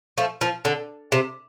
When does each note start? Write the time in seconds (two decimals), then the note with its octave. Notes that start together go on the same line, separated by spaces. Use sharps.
0.18 F3 A3
0.41 F3
0.65 D3
1.12 C3